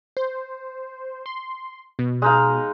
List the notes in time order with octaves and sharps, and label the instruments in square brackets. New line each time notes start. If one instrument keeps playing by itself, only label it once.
[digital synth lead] C5
C6
B2
[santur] G#3 D#4 F5